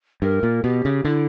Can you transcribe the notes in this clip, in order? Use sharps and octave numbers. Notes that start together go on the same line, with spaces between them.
G2 A#4
A#2
B2 G4
C#3
D3 E4